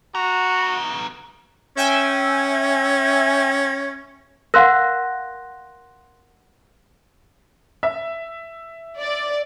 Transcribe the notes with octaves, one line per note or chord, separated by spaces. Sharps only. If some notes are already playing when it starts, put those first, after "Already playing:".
B3 F#4 A#5
C#4 E5 G5 G#5
A#4 F5 F#5 C6 F#6 A#6
E5
D5